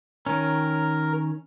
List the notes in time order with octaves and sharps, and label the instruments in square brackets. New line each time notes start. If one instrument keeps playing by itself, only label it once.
[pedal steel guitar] D#3 C#4 [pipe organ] A#4